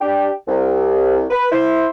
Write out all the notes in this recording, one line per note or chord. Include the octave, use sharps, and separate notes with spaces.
D4 G4
C2
B4
E4 C5